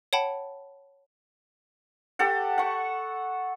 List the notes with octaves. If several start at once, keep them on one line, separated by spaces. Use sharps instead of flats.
C#5 F#5 G5 A5 B5
G4 A4 F#5
F#5 C#6